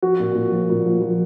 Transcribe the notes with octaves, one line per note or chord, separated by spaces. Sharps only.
F3 F#4
A#2
A#2
F3
A#2
F3
F3